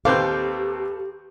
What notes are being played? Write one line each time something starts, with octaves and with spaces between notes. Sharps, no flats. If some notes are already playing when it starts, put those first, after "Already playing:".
D#2 C4 G4 A4 B4 F5 D6 G6